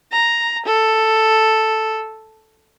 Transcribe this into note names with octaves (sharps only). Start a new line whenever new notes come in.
A#5
A4